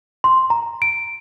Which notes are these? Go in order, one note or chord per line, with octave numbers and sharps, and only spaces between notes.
C6
A#5
D7